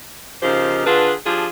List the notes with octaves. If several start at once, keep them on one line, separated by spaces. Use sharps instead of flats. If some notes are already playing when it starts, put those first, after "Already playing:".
C#3 F3 D#4 G4 A#4 C5
D3 D4 F4 G#4 B4
F3 D4 F4 G4 G#4